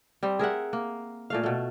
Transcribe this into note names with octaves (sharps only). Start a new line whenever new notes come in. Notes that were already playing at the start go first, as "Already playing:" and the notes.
G3 C4
G#4 A#4 E5 F#5
A#3
A#2 A3 F5
B2 A3